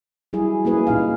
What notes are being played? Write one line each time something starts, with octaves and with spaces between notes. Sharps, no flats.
F#3 G3 E4 G#4
A#3 C#4 E4 G#4 B4
A#2 D#4 F5